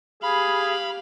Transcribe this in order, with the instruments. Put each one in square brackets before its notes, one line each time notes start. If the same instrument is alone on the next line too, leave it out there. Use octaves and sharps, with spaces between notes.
[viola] G4 F5 [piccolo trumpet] G#4 [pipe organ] B5